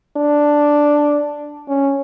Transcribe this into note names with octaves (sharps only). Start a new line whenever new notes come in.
D4
C#4